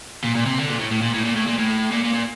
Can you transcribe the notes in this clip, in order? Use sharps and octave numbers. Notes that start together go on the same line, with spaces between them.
A#2
A#2
C3
D3
A#2
A2
A2
A#2
A2
A#2
A2
A#2
A2
A#2
A#2
A#2